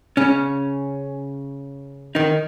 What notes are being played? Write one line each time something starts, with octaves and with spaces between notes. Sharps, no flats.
C#3 C#4
D#3 D#4